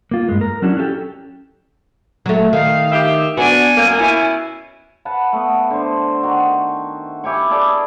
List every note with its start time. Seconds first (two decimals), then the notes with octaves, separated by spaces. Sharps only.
0.11 A#3 F4
0.29 G2 G#3
0.41 A#4
0.62 F#3 C#4 D4 E4 F#4
0.77 C#4 G4 A4 E5 G5
2.26 F#3 A3
2.53 D#3 F5
2.92 G4 E5
3.37 B3 D4 F#4 G#5
3.77 F#2 A#3
4.00 B2 C#4 E4
5.05 B4 F#5 A5
5.33 A3 B3
5.70 D3 C5
6.23 D#3 F#4
7.24 E4 G4 G#5 C#6
7.50 G#4 A4 B4 D5